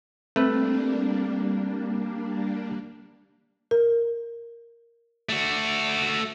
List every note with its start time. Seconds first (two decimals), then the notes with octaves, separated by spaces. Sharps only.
0.36 G3 A3 A#3 C4 D4 B4
3.71 A#4
5.29 A3 F#4